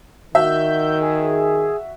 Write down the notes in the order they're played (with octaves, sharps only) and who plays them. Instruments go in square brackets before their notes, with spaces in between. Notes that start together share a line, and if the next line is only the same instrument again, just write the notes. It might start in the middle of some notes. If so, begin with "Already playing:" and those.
[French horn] D#3 [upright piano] F#4 E5 [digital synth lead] G6
[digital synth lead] G#4